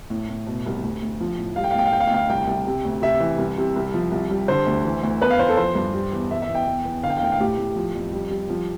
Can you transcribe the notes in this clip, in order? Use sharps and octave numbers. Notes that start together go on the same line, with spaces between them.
A2
A2
B2
C2
D2
D2
F3
A2
G3 F5
G5
F5
A2 G5
F5
D2 G5
F5
G5
D2 F5
C2 G5
C2
C3
D2
C3 E5
E3
C2
C3
C2
F3
C2
G3
D3 C5
D2
E3
D2
E2 B4
F5
E2 C5
A4
F3 C5
G2
G3
E2
E2 E5
E5
E2
G5
E2
E2
D3 F5
G5
F5
D2 G5
F5
A2 G4
A2
F3
F2
G3
G3
F3